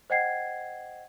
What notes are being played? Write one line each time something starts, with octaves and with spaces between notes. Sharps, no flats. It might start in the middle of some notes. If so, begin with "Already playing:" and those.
C5 D#5 F#5 G5 G#6 C7